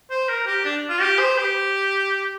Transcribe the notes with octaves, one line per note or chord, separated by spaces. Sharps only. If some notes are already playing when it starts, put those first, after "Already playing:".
C5
A#4
G4
D4
F4
G4
C5
G4